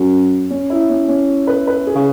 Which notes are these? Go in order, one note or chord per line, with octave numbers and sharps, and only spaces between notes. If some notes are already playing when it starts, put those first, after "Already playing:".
Already playing: F#2
C#4
E4
C#4
C#4
B4
B4
G#4
C#3